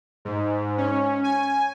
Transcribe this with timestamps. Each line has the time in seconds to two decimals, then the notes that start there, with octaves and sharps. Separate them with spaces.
0.25 G#2
0.78 C#4
1.24 G#5